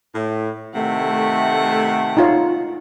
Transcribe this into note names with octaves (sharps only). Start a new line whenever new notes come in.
A2
C3 D#3 A3 F#5
D#4 F4 C#5